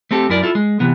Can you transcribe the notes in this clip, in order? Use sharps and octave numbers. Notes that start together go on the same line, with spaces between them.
A3 C4 G4 A4
F#2 E4 A#4 D5
E4 F4 A4
G#3
C3 E3 B3